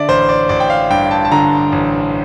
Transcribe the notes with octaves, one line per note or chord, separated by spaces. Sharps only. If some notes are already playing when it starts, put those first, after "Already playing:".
Already playing: D3 D5 E5
A1 C5
D5
A1 D5
G5
F5
G2 G5
A5
A5
D3 A#5
A1